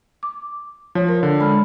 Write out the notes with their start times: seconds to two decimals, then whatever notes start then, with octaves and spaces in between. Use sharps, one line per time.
0.23 D6
0.95 F3 C#5
1.09 A#4
1.23 D3
1.39 G#3 B5 F6